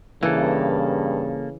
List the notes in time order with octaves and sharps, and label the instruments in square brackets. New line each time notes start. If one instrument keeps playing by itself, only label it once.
[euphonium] G2 [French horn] C#3 [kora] E3 [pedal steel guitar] A#3 A4